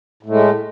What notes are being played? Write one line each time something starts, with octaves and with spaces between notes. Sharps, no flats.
A2 G#3 A3